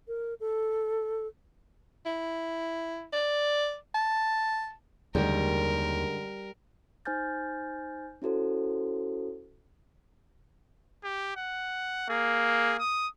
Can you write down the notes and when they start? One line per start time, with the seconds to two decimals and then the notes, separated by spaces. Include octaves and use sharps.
0.08 A#4
0.40 A4
2.06 E4
3.12 D5
3.94 A5
5.15 F#1 D#2 D3 G3 G#3 A#4
7.05 D#4 C5 G#5 F6 G6 A6
8.22 C#4 E4 F#4 A4 C5
11.04 G4
11.36 F#5
12.10 A#3 G#4
12.79 D#6